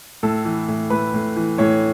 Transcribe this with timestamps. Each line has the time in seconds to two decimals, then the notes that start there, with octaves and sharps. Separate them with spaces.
0.23 A2 A4
0.45 E3
0.68 A2
0.90 A2 B4
1.14 A2
1.36 E3
1.58 A2 C#5